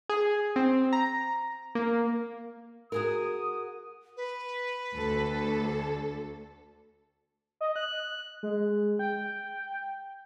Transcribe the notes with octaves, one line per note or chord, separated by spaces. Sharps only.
G#4
C4
A#5
A#3
F#4 G#4 A#4 D#6
B4
D2 A4
D#5
F#6
G#3
G5